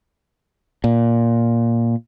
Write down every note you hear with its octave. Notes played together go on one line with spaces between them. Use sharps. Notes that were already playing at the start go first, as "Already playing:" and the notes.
A#2